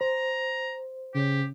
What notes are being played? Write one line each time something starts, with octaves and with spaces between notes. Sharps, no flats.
C5 A#5
C#3 G4